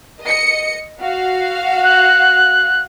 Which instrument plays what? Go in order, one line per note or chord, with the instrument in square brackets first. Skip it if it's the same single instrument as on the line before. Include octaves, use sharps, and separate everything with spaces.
[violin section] D#5 C#7
F#4 F5
[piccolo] F#6